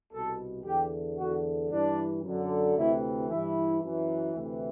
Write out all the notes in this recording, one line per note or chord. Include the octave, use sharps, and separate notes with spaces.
C2 B2 A4
E2 D3 G4
E2 D3 F#4
G2 E3 D4
F#2 D3
D2 C3 E3 E4
G2 E3 E4
F#2 E3
D2 C3 E3